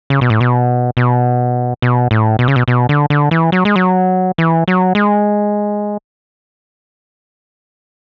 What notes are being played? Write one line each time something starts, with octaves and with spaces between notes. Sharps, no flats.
C#3
B2
A2
B2
B2
B2
A2
B2
C#3
B2
B2
D3
D3
E3
F#3
G#3
F#3
E3
F#3
G#3